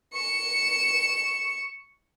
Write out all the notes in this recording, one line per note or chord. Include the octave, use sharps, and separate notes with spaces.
C#6 C#7 E7